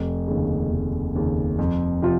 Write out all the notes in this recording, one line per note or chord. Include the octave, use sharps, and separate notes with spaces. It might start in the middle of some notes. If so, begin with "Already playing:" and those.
Already playing: F1
D#2 C#3
F1
D#2 C#3
F2
C3 F3 C4 F4